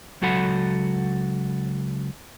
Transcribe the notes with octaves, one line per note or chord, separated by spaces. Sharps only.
C#2 F#3 F#4 A4 F#5 B5